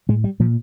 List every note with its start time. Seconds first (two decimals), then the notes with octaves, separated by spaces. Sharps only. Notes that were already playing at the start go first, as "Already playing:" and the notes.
0.09 A2 G#3
0.24 G3
0.40 A#2 F3